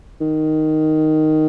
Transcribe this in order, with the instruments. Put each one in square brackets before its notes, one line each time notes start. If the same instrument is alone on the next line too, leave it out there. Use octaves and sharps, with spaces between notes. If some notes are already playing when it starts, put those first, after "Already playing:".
[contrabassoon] D#3